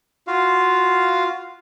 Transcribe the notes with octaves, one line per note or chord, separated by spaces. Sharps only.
F4 F#4 F5